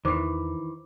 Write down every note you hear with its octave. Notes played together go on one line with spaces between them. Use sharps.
E2 D#3 E3 C5 D6